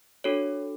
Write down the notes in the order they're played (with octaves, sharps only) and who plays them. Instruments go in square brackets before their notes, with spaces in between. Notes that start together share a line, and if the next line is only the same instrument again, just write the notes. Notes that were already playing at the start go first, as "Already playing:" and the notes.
[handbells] D4 F#4 A4 C#5